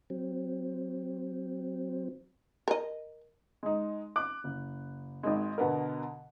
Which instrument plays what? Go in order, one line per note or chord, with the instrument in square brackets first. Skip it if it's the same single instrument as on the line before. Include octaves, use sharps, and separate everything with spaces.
[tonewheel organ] F#3 C4
[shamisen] A#4 D#5
[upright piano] G#3 D#4
D6 F#6
F#1
G#1 D#3 G#3
B2 D3 B3 A#4